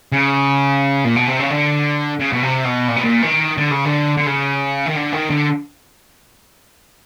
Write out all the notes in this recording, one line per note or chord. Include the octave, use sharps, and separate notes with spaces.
C#3
A#2
B2
C3
C#3
D3
C#3
B2
C3
B2
A#2
B2
A#2
D#3
D3
C#3
D3
D3
C#3
D#3
D3
D#3
D3